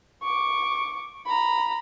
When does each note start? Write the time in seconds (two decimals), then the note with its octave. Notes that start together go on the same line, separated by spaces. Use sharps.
0.23 C#6 D6
1.26 A#5 B5